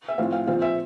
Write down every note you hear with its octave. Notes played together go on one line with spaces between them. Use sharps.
E5
A2 F3 C4 F5
F5
A#2 F3 C4 F5
E5